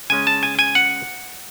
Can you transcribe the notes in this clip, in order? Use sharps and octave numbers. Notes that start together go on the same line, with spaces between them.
C#3 G#3 C#4 G#5
A5
G#5
G#5
F#5